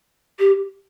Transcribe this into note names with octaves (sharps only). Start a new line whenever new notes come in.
G4